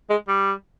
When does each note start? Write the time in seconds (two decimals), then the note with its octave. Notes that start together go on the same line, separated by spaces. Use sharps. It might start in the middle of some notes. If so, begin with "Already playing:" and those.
0.10 G#3
0.28 G3